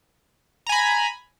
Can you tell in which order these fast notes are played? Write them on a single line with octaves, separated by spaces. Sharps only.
A#5 G#5 B5